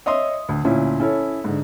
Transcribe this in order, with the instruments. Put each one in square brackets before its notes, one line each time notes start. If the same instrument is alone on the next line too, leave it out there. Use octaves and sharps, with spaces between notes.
[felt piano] C#5 D#5 E5 C6 D#6
D2
D2 A#2 C#4 E4
C#4 E4 A4 C#5
G#2 D3